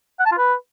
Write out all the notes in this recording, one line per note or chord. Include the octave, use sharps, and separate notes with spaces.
F#5
A5
F4
B4